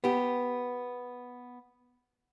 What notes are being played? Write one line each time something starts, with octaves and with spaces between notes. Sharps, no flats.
B3 G4